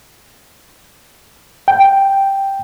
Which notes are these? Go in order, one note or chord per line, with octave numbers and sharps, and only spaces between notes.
G5